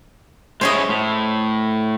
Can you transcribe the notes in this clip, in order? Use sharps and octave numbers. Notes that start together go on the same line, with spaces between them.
G#3 C#4 E4 C5 C#5 D#5
A2